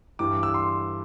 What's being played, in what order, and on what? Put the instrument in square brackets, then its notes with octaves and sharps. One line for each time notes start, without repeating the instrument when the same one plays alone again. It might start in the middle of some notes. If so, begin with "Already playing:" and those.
[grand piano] G2 E3 G3 D6
E6
C6